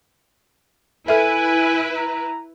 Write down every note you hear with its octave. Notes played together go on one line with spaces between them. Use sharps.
E4 A4 B4 E5 G#5
A#5